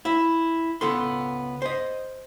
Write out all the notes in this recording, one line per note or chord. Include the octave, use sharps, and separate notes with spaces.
E4 E5
C#2 B3 A4 C6
C5 D#5